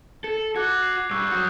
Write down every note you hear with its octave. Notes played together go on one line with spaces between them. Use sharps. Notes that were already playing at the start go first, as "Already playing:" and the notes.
A4 C#7
F#4 D6 F#6 G#6
C7
G2 C#6 E6 G6
F#3 F#4 D#6 G6 C#7